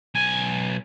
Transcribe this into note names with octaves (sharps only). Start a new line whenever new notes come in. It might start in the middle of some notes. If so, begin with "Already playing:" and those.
B1 G#5